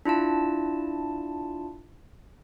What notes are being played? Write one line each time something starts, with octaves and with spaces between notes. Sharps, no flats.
D4 E4 F4 A5